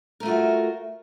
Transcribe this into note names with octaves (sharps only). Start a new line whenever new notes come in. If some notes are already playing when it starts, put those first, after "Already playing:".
A3 F4 F#4 A#4